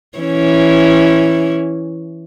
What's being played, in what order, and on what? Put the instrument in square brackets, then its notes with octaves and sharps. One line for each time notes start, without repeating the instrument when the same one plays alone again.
[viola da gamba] E3 C#4 E4